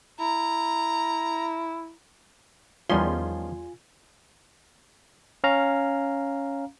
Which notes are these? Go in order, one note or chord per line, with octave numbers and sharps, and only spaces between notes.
E4 A#5
E2 D#3 F3 G3 C#4 F4 G#5 C6
C#4 F5 A#5